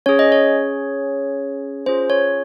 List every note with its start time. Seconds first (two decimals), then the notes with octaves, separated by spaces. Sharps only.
0.06 C#4 G#4 C#5
0.19 D#5
0.32 C#5
1.86 C#4 F4 G#4 C5
2.10 C#5